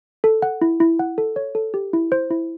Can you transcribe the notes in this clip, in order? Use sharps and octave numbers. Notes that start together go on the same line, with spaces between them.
A4
F#5
E4
E4
F#5
A4
C#5
A4
G4
E4
C5
E4